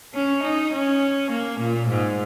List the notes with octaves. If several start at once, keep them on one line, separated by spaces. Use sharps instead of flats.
C#4
D#4
C#4
A#3
A#2
G#2